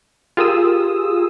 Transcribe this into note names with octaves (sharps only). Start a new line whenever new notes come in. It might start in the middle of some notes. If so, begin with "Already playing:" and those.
F4 G4 G#4 A#4 D#6 E6